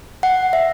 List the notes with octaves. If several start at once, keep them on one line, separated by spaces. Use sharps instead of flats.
F#5
E5